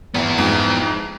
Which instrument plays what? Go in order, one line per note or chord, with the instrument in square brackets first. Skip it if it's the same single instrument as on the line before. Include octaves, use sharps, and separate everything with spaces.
[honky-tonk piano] G#1 [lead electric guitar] B3 E4
[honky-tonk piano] F2 G#2